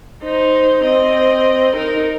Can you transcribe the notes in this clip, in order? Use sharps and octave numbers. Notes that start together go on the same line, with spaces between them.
D#4 C5
C4 D#5
D#4 A#4